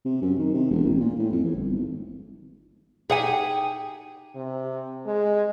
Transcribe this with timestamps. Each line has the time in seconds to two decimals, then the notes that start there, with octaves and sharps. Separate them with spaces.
0.05 C3
0.22 F#2
0.38 D#3
0.54 C3
0.71 E1
0.85 A1
1.00 A#2
1.18 A2
1.32 F2
1.44 E2
1.56 G1
1.72 G#1
3.10 D#4 G4 G#4 F#5 G#5
4.36 C3
5.06 G#3